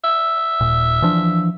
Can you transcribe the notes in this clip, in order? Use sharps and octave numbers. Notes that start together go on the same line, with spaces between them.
E5
D#1 A#2
E3 F3 D4